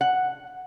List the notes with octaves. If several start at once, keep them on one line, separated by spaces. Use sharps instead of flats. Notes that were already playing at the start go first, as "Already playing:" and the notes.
F#5